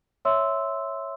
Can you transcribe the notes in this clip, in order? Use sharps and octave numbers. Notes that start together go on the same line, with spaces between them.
C#5 E5 C6 E6